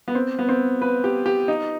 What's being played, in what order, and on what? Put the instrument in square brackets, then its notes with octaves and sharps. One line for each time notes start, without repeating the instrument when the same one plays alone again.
[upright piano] B3
C4
B3
C4
B4
G4
G4
D#4